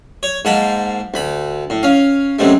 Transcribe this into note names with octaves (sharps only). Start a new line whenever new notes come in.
C#5
G#2 A#3 F#5 A5 B5
D2 B5
A2
C#4 F5
F#2 C3 G#3 A3